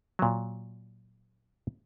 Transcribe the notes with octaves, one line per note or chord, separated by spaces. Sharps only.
A#2 F#3